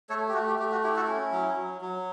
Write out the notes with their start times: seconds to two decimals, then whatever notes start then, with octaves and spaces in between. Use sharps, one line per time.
0.09 A3 A4 C#5
0.29 G4
0.34 A3 F#4
0.46 G4
0.59 A3 G4
0.72 F#4
0.84 E4 G4
0.96 F#4 A4
1.08 C#4
1.32 F#3
1.57 F#3
1.81 F#3